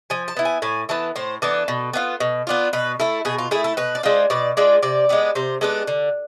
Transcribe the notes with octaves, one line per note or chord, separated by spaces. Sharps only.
F3 G#5
A5
B3 E4
G#5
A2 G#5
E3 B3 A5
A2 C5
E3 B3 D4 A4
B2
B3 D4 F4
B2
B3 D4 F4
B2 B4
A3 E4 A4
B2 G#4
F4
A3 E4 G#4
A4
B2 B4
D5
G#3 D4 F4 C5
B2 D5
G#3 D4 F4 D5
C3 D5
G#3 B3 D4
C3 C5
G#3 B3 D4 A4
D3